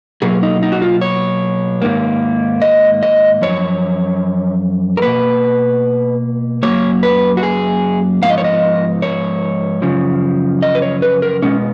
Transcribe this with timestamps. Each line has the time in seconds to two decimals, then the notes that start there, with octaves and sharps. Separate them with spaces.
0.22 B2 F#3 A#3 G#4
0.43 D#4
0.63 D#4
0.72 F#4
0.82 F4
1.01 C#5
1.82 G#2 D#3 A#3
2.62 D#5
3.03 D#5
3.42 F#2 F3 C#5
4.97 A#4
5.02 B2 A#3 B4
6.63 C#3 F#3 A#3 C#5
6.67 F#2
7.03 B4
7.37 F#4
7.43 G#4
8.22 G#2 F3 B3 F5
8.30 D#5
8.38 C#5
8.44 D#5
9.02 C#5
9.82 F#2 C#3 F3
10.62 D#5
10.75 B4
10.82 C#5
11.02 B4
11.22 A#4
11.42 B2 G#3 B3 C#4